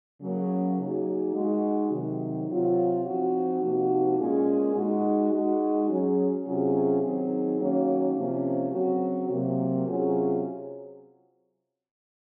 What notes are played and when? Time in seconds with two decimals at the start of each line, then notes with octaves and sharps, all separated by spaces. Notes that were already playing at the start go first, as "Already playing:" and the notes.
0.21 C#3 F#3 A#3
0.78 F#3 A#3 D#4 G#4
1.33 G#3 D#4 F#4
1.91 C3 D#3 F#3
2.48 C3 F#3 C4 F4
3.04 F3 C4 D#4 F#4
3.61 C3 F3 A#3 D#4 F#4
4.18 A#2 G#3 C#4 F4 G#4
4.75 G#3 D#4 F#4
5.32 G#3 D#4 F#4
5.88 F#3 C#4 G#4
6.45 C3 F#3 C#4 F4 G#4
7.01 D#3 F#3 C4 D#4 G#4
7.59 D#3 F#3 A#3 C#4
8.15 C3 F3 A#3 C#4
8.72 C#3 F#3 C4 F#4
9.29 C3 F#3 A#3
9.86 C3 F#3 C#4 F4 G#4